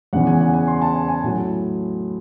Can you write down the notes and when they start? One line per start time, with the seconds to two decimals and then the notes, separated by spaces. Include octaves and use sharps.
0.13 E2 C#3 E3 F#5
0.27 G#5
0.41 F#5
0.54 G#5
0.68 C6
0.82 A5
0.95 G#5
1.08 G#5
1.23 A2 F#3